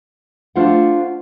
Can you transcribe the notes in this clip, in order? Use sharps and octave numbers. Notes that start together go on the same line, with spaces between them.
A3 D4 F4 C5 D5 F#5